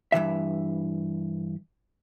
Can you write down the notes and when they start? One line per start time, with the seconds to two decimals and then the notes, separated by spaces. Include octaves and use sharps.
0.12 G2 C#3 E3 E5